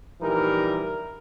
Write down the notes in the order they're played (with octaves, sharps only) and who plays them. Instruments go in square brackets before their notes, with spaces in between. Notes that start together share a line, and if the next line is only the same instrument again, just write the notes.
[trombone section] A#1 E3 G3 D#4 A#4